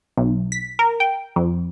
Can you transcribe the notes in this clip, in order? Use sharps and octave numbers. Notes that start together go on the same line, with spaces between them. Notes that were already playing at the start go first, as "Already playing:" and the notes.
B1
B6
A#4
G5
F2